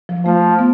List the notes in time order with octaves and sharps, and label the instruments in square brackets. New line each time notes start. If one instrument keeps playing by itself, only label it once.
[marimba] F3
[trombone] F3 [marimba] A3
[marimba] B3